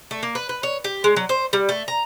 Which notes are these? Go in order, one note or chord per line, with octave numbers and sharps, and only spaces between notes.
A3
A#3
B4
B4
C#5
G4
G#3
F#3
C5
G3
A3
A#5